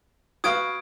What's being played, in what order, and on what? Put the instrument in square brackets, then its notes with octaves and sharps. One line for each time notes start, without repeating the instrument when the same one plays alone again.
[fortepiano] F#4 B4 F5 [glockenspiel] D#6 G#6 D7